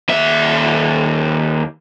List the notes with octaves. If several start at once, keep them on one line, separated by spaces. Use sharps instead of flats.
D#2 E5